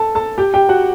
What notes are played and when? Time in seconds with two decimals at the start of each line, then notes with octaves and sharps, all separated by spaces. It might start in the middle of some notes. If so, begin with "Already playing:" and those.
Already playing: A4 A5
0.15 A4 A5
0.38 G4 G5
0.54 G4 G5
0.69 F#4 F#5